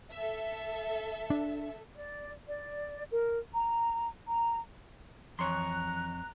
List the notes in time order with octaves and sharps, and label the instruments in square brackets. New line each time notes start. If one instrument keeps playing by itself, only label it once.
[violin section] A4 E5
[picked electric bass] D4
[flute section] D5
D5
A#4
A#5
A#5
[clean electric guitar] F2 C#5 [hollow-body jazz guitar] E3 C6 [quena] A#5 [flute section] F#6